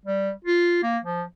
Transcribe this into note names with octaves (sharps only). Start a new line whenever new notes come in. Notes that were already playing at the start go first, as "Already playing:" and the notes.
G3
F4
A#3
F3